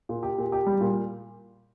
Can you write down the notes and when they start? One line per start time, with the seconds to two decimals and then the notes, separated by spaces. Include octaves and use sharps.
0.09 A#2
0.23 G4
0.38 A#2
0.52 G4
0.66 G3
0.81 A#2